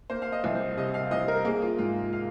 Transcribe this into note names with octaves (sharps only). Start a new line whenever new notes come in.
A#3 C5
F5
D#5
C2
C5
C3 D#5
F5
C2 D#5
A#4
A#3 G#4
F4
G#2 F4
F5